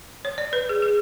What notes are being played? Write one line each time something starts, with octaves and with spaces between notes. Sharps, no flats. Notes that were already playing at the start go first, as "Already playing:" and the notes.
C#5
D5
B4
G#4
G#4